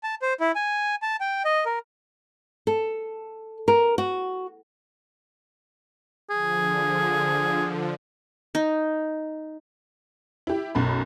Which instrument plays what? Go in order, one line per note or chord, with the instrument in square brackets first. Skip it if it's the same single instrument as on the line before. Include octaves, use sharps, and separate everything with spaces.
[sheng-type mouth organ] A5
C5
E4
G#5
A5
G5
D#5
A#4
[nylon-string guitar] A4
A#4
F#4
[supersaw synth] D3 F3 [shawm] G#4
[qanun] D#4
[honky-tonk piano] E4 G4
B1 F#2 B5